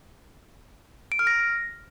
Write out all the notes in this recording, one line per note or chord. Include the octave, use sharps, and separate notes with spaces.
D7
F6
A#6